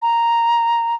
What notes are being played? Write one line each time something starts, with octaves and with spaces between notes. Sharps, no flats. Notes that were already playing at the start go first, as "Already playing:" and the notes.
A#5